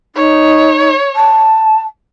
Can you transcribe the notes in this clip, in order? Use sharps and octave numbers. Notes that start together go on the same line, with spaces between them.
D#4 C#5
A5